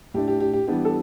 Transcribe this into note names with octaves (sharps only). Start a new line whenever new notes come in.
A2 A3 D4 G4
G4
G4
G4
E3 G3 B3 D4 G4
A4